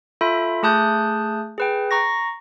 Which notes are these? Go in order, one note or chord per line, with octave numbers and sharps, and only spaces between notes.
F4 A4 E5 B5
A3 G#4 A5 D#6 F#6 G6
G#4 B4 G5
A#5 C#6 A#6